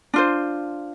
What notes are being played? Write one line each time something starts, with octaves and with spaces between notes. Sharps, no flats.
D4 F4 C5